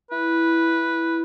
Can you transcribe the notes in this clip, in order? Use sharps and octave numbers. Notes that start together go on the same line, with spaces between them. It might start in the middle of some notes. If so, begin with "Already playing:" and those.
E4 B4